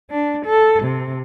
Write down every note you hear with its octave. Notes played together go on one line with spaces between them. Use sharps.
D4
A4
C3